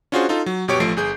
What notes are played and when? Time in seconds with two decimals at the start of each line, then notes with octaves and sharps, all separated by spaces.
0.12 C#4 D4 F4 F#4 G#4 C5
0.29 D#4 F4 A4
0.46 F#3
0.68 G1 B2 G4 C#5 C#6 D7
0.80 A1 F3 A3 C7 D7
0.97 G1 G#4 G6